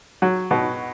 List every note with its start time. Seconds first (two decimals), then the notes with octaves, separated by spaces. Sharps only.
0.22 F#3
0.51 B2